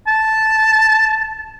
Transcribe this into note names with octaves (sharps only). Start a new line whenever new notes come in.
A5